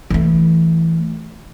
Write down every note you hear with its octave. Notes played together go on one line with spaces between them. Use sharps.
E3 A3